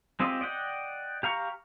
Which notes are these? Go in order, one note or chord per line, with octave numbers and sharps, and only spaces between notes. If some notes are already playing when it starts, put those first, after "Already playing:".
G#3 C4 F4 G4 D#5
D5 D#5 F#5 G5
G4 F5 A#5 C#6